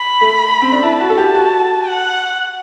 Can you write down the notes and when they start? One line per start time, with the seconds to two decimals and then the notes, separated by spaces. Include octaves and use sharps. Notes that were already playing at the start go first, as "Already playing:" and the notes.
Already playing: B5
0.21 A3
0.62 C4
0.72 D4
0.83 E4 A5
1.00 F#4
1.10 A4
1.17 G4
1.35 F#4
1.87 F#5